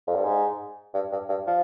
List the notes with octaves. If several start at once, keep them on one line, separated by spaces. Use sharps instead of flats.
F2
G2
G#2
G2
G2
G2
F3